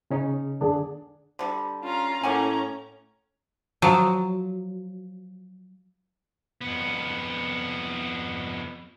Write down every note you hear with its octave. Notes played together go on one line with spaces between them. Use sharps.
C#3 C#4 D#4
D3 D4 G#4
D3 G3
C#4 F4 A#5
A2 A#3 C#4 F#5 G#5 A#5
F3 F#3
F2 B3